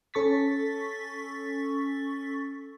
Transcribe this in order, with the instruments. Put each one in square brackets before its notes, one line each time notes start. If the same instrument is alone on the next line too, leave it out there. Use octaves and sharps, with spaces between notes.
[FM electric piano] C#4 A4 C#6 A6 B6